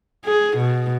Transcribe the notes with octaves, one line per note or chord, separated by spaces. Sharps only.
G#4
B2